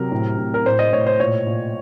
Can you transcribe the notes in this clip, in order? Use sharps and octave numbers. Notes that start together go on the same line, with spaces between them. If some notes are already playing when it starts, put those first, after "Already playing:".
Already playing: C3 F#3 A#4
A2
A2
A#4
A2 C5
D#5
A2 C#5
C5
A#2 C#5
A#2